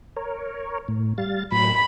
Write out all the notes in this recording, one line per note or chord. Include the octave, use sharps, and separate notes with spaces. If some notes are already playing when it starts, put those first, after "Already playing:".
A#4 C#5
A2
G3 F5 A6
A2 F#3 B5